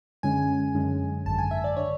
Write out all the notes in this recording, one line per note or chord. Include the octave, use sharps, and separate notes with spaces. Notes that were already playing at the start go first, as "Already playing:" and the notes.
F#2 D3 G#3 C#4 G#5
F#2 D3 G#3 C#4
G#1 F#2 D3 A5
G#5
E5
D5
D3 C#5